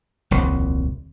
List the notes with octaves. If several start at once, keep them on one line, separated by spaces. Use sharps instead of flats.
D#1 C2 F2